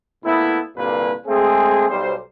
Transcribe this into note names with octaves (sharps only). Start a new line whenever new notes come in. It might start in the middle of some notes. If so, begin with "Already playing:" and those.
A#2 A3 B3 E4
C2 G2 A#2 D3 A#3 B4
G#3 A3 C4 G#4
B1 G3 C5